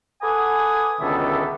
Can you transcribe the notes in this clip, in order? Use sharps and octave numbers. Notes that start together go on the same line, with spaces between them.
A4 B4 F#5 G#5 D6 D#6
C#2 B2 D3 D#3 A4 E5